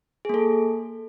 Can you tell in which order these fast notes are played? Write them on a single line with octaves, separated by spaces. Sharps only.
G#4 A#3 A4